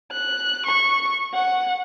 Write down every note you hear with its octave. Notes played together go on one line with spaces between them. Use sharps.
F#6
C#6
F#5